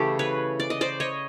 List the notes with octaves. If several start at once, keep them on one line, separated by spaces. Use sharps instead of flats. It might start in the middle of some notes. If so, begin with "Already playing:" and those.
Already playing: C#3 E3 A3 G4 A4
B4 C#5
D5
D#5
C5 D5
C#5 D#5